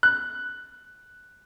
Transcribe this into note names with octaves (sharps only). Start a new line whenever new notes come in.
F#6